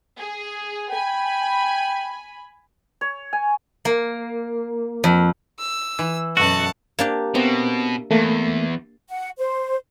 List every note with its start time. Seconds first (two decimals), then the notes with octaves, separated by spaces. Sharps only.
0.18 G#4
0.90 G5 G#5 B5
3.01 C#5
3.33 G#5
3.85 A#3
5.04 F2
5.59 E6
5.99 E3
6.37 F#2 B2 A3 F#4 F#5 A5
6.99 A#3 D4 G4
7.35 B2 B3 C4 E5
8.11 E2 A3 A#3
9.09 F#5
9.38 C5